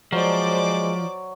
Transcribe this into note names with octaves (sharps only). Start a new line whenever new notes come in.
F3 F#3 G#3 C5 D5 D6